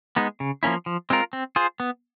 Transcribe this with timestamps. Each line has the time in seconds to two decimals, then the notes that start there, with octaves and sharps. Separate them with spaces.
0.16 G#3 B3 D#4
0.40 C#3
0.63 F3 A#3 C#4 E4
0.86 F3
1.10 G#3 C4 F4 A#4
1.33 C4
1.56 F4 G#4 C5
1.80 B3